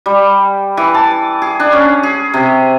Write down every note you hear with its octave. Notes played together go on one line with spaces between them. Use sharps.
G3
E3
A5
G#4
D4
C#4
G#4
C3